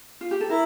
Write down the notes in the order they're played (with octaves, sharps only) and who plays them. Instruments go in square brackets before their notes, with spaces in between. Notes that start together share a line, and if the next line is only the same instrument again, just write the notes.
[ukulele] F4
G4
A4
[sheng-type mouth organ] E4 [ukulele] A#4